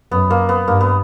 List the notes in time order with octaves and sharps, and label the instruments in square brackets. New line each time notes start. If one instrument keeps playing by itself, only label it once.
[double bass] F#2 [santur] B3
[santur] A#3
B3
[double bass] G2 [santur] A#3
[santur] B3